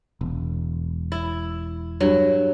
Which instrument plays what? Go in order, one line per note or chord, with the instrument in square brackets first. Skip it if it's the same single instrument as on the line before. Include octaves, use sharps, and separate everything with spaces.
[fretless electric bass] E1
[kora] E4
G2 F#3